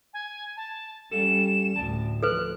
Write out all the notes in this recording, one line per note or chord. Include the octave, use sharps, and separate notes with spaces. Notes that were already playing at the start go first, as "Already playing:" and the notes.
G#5
A5
G3 C#4 A4 F5 E7
D2 A2 D5 A5
F3 A4 B4 F#6